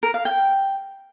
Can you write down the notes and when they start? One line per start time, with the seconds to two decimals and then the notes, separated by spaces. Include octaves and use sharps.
0.03 A#4
0.14 F5
0.25 G5